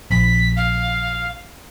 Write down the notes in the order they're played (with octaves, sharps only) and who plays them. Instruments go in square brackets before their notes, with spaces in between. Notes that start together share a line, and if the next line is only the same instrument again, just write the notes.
[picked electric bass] A#1 [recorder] B6
[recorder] F5